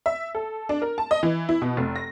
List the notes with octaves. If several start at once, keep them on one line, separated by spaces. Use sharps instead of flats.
E5
A4
D4
A#4
A5
D#5
E3
E4
B2
F1
A#6